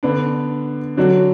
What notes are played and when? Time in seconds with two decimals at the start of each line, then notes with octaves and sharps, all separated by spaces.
0.03 D3 B3 D4
0.97 D3 F#3 D4 F#4